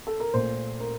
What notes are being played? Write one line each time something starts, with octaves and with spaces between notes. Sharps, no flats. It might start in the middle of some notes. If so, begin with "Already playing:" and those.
A4
A#4
A#2 A3 C5
A#4